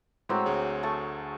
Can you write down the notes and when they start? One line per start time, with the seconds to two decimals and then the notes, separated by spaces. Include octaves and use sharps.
0.29 A2 F#3 G#3 C4 D6
0.46 D2 G#4 C#5
0.83 A3 A5 C#6